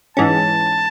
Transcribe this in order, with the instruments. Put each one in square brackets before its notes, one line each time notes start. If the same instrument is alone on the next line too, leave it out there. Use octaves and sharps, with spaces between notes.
[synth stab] G#2 E3 G#3 C#4 [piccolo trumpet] A5